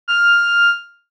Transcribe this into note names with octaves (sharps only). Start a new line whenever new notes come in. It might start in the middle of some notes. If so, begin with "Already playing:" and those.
F6